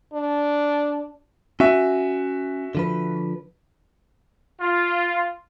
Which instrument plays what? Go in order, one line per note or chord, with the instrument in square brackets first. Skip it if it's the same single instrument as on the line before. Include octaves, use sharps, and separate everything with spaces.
[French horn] D4
[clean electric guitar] C#4 G#5 [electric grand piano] F#4 E5
[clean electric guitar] D3 F3 B4
[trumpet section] F4